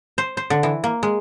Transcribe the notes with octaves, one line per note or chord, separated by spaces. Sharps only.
C5
C5
D3
E3
A#3
G#3